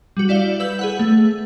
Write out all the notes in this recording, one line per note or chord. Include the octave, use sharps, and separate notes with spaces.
G3 F#4
E4 D5 F5 G7
B4 E6 G6 F#7
G#4 B4 F#5
A3